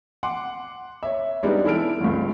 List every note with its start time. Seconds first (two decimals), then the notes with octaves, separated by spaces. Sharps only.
0.23 F#5 C6 D6
1.03 C#5 E5
1.43 G3 G#3 B3 D4 D#4 B4
1.64 E3 E4 A4 E6 F6 D7
2.01 G1 C#2